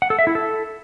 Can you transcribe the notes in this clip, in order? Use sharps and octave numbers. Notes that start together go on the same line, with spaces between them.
F#5
A4
E5
E4
A4